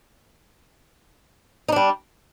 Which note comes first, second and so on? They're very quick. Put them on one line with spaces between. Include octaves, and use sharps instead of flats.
D#4 D4 G3